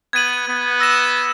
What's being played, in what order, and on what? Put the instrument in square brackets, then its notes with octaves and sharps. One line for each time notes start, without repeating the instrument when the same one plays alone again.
[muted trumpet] B3 [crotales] G#6 D#7 F#7
[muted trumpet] B3
[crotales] E6 A#6 E7